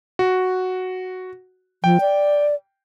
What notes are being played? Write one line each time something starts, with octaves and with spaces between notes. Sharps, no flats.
F#4
F3 G5
D5